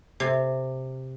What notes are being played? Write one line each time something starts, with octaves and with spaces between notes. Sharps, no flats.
C3